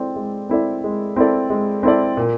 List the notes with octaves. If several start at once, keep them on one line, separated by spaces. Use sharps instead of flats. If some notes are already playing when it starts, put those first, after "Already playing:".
Already playing: G#3 C4 E4 A4 D5
G#3
C4 E4 A4 D5
G#3
C4 E4 A4 D5
G#3
C4 E4 A4 D5
A#2